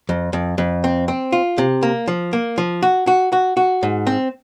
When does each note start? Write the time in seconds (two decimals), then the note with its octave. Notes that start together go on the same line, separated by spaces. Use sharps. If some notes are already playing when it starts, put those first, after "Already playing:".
0.09 F2
0.33 F2
0.58 F2
0.84 C4
1.08 C4
1.32 F4
1.58 C3
1.83 A#3
2.08 F3
2.33 A#3
2.58 F3
2.82 F#4
3.07 F#4
3.32 F#4
3.57 F#4
3.83 G#2
4.07 C4